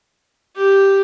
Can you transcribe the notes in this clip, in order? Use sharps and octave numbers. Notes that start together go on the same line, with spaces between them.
G4